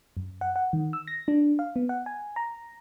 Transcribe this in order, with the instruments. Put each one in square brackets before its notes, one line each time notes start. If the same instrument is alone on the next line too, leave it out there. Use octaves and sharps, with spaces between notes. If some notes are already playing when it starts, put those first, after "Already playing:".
[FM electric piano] F#2
F#5
F#5
D#3
E6
A#6
D4
F5
B3
F#5
G#5
A#5